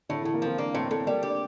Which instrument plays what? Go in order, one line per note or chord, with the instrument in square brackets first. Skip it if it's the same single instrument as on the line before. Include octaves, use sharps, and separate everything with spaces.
[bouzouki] A2 [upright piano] D3
[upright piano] E3
[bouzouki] A2
[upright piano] A#3
[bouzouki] F3 [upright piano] C4
[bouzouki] A#3 [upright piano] D4
[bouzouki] A2 [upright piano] C4
[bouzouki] A2 [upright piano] A3
[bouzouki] G3 [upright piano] A#3
[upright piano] D4 [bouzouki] G4